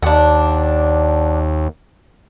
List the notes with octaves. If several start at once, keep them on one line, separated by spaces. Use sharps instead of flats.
D#2 D4 F#5